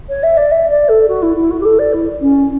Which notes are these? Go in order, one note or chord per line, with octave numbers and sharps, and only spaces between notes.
C#5
E5
D5
E5
D5
A4
F#4
E4
E4
F#4
G4
A4
D5
E4
C#4